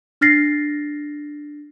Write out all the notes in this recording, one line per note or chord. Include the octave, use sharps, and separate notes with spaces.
D4 F6 A6 A#6 C7